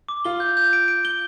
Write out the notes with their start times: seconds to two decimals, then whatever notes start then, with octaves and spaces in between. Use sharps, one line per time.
0.09 D6
0.25 F4 G7
0.40 G6
0.57 G6
0.73 D7
0.88 D7
1.05 G7